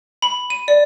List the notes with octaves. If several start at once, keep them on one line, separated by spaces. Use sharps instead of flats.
B5
D#7
D5